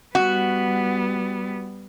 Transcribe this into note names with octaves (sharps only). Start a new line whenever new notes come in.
G3 B3 F#4